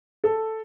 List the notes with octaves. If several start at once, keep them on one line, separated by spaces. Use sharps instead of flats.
A4